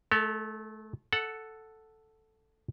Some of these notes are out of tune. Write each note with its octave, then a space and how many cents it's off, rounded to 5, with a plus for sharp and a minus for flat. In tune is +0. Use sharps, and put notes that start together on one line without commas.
A3 -30 A4 +35
A4 +0 F#5 +0